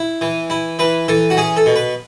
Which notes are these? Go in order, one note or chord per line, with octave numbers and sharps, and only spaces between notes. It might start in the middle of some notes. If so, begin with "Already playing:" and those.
Already playing: E4
E3
E4
E3 B4
E3 A4
F#4
C#4 G#4
A4
B2
B4